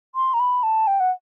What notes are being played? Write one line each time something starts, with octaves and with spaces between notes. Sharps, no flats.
C6
A#5
B5
A5
G5
F#5